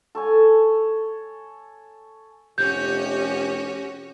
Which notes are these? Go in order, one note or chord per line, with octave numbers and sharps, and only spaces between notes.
A4 C#5 G#5
F1 C#4 F#4 G4 G6